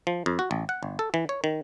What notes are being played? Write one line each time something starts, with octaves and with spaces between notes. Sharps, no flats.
F3
F2
F#4
A1
F#5
G1
A4
E3
C#5
D#3